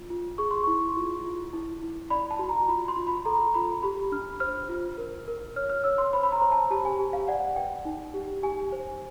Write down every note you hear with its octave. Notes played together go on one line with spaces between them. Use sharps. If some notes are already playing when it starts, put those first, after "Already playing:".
Already playing: F4
F4
G#4 C#6
C6
E4 C#6
F4
F4
E4
E4
D5 B5
A5
F#4
A#5
F4 B5
C6
F4
B5
A4 A#5
F4 B5
G4 B5
D4 F6
C5 F6
F4
A#4
A#4
C#5 F6
F6
C#5 E6
C6
C5 B5
B5
A#5
C5
A5
G4 A5
G#5
G4
F5
D5 F#5
B4 G5
D#4
G4
G4 G#5
C5